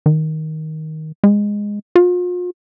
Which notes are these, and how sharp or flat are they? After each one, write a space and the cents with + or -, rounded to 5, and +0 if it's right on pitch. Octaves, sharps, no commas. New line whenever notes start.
D#3 +10
G#3 -10
F4 +40